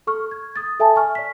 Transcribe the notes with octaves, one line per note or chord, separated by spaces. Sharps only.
A4 C#6 F6
G#6
D#6 A6
A4 E5 G#5 A5
G#5 C#6 F6
D5 B6